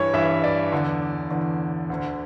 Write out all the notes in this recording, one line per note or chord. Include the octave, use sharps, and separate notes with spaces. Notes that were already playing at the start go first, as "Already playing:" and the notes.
Already playing: G2 E3 C#5
G2 E3 E5
D5
E2 D3
E2 D3
D2 D3